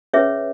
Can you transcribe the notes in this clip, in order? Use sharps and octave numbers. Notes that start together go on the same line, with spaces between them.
C#4 G#4 B4 C#5 E5